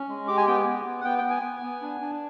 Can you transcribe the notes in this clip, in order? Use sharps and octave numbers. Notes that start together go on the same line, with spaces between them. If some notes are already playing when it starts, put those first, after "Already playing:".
Already playing: C#4
G#3
G4 D6
G#5
B3 G5
B3
B3
F#5
B3 G5
G5
B3
G#5
B3
B3
D4
D4